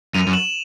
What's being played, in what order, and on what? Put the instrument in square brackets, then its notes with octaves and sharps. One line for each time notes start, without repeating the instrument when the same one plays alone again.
[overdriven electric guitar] F#2 [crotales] D#7 F7
[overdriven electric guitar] F#2
[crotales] E7 F#7